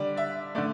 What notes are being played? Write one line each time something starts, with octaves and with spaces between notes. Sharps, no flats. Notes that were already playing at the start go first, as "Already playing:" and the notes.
Already playing: D3 G3 D5
E5
D3 A3 D5